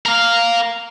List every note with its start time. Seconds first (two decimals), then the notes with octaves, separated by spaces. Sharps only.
0.06 A#4 F5